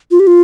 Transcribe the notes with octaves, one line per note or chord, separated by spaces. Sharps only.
F4
G4
F4